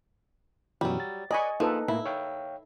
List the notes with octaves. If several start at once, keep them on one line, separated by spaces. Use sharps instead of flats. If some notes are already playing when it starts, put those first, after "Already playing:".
F#2 B2 E3 F#3 G3
A6
B4 D5 D#5 G#5 C#6
F3 A#3 D#4 A4 B4 D#6
A2 A#3 E4
C#5 F5 G5